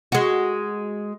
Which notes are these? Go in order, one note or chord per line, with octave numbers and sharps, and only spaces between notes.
G#3 F#4